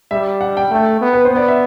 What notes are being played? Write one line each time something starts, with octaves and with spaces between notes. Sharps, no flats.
G3 E5
F#5
G5
A3 G5
B3
B4
C5
B3
D5
E5